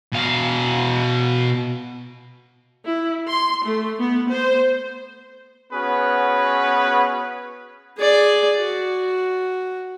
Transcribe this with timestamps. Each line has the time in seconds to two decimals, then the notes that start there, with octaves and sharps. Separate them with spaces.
0.13 B2 F5
2.86 E4
3.28 C6
3.64 A3
4.00 B3
4.31 C5
5.72 B3 C#4 F#4 G#4 B4
7.98 G#4 D5
8.58 F#4